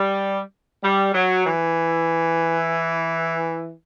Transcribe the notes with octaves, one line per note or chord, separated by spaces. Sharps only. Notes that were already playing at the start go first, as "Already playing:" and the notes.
Already playing: G3
G3
F#3
E3